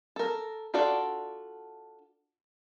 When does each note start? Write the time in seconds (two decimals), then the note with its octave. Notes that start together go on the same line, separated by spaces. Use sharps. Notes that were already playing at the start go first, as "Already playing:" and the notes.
0.16 A4 A#4
0.74 D4 F4 F#4 A4 D5